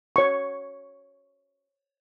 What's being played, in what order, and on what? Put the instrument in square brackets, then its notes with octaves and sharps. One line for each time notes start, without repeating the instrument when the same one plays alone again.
[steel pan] C#5 C#6